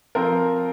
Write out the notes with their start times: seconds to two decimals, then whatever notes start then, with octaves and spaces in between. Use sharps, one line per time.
0.15 F3 C4 A#4